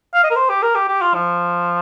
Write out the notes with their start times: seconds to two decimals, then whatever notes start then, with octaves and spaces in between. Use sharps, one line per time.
0.14 F5
0.24 D#5
0.30 A#4
0.36 C5
0.49 G4
0.63 A#4
0.75 G4
0.88 G4
1.01 F4
1.14 F3